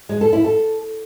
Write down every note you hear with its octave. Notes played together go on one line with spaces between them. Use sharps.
G#3
A4
E4
A4